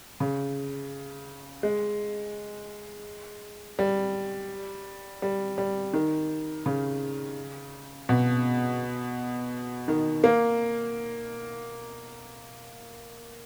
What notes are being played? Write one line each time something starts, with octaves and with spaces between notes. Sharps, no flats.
C#3
G#3
G3
G3
G3
D#3
C#3
B2
D#3
A#3